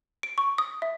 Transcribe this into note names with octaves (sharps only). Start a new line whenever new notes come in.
D7
C#6
D#6
E5